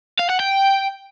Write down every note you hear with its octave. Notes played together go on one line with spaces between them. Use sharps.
F5
F#5
G5